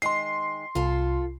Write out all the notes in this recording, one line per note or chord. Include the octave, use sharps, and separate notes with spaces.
D#3 G#3 C6 C7
C2 F4 A4